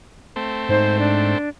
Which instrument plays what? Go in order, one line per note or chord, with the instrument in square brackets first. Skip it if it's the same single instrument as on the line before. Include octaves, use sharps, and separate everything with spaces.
[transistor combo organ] A3 C4
[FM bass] G#2 [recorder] C5
[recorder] D4